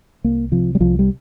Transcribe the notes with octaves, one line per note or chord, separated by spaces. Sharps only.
C2 A#3
C3 F3
G3
C2 F3
G3